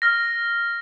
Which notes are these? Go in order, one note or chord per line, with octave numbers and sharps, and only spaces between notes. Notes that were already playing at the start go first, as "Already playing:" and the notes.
F6 A#6